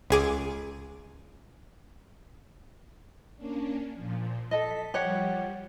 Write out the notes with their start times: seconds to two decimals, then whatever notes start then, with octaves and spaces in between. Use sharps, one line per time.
0.10 C#2 G#4 D6
3.37 A#3 C#4 D4
3.95 A#2 F3
4.51 A4 D#5 B6
4.94 F3 G3 G4 C#5 F#5